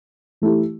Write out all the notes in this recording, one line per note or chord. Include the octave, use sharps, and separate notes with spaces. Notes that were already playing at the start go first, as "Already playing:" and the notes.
E3 A3 E4 G4